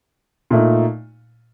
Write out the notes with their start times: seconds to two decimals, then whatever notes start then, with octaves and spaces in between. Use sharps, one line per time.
0.51 A#2 A3 D#4